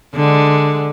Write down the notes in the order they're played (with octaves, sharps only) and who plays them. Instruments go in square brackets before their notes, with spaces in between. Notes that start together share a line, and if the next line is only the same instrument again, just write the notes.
[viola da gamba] D3 G#3